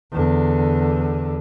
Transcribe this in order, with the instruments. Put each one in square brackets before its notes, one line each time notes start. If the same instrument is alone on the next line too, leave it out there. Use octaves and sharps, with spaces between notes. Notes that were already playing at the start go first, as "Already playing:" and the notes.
[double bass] E2 D3